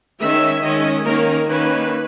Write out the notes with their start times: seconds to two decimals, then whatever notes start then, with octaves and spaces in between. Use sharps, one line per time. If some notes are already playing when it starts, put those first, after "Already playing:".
0.21 D#3 G#3 C#4 E5
0.63 D#3 G#3 C#4 D#5
1.05 D#3 A#3 C#4 A#4
1.47 D#3 A#3 C#4 B4